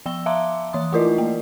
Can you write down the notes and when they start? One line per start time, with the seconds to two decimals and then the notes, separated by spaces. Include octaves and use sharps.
0.06 F3 G5 E6 G7
0.26 E5 F5 A5 A#5 C6 D6
0.73 E3 C6 D#6
0.93 A3 E4 F4 A#4 D5 D#5
1.18 A#3